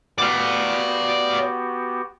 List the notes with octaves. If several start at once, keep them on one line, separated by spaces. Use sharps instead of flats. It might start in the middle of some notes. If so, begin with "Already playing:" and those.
B3 F#4 G4 D5 F5